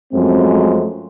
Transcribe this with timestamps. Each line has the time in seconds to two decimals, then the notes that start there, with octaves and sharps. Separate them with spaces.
0.13 F#2 F3 G#3 A3 C4